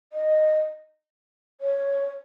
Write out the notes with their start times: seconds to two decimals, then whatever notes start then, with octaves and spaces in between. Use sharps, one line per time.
0.13 D#5
1.61 C#5